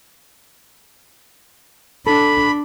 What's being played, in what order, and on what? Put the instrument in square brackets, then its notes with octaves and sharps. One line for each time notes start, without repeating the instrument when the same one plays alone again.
[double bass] D4 [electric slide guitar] A4 [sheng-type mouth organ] B5